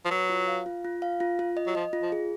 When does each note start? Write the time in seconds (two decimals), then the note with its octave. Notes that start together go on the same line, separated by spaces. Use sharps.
0.05 F3
0.11 F#3 B4
0.30 F4
0.48 F5
0.66 F4
0.85 F4
1.02 F5
1.20 F4
1.39 F4
1.57 D#5
1.67 F#3
1.75 F3 D#5
1.93 F4
2.02 F3
2.12 G#4